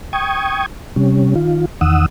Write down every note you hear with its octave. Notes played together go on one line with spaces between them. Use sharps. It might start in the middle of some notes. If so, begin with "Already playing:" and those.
G5 C#6 D#6 G#6
C3 G3 C#4
D#3 F4
E2 D#3 F#5 D#6 E6